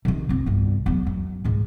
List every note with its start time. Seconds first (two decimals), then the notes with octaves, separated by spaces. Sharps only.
0.05 C3 D#3
0.29 F2 C4
0.46 G1 C2
0.86 E2 F#3
1.07 F#2
1.44 C#2 G#2